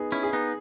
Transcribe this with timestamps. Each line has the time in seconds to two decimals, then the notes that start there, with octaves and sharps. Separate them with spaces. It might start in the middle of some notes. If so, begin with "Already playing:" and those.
Already playing: B3 D#4 G#4
0.12 C#4 E4
0.23 G#4
0.33 B3 D#4